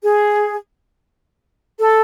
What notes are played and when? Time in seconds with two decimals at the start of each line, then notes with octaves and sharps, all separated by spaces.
0.02 G#4
1.79 A4